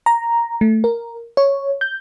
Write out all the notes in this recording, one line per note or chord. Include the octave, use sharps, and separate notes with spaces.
A#5
A3
A#4
C#5
G6